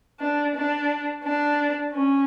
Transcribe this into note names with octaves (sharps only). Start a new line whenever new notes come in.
D4
D4
D4
C#4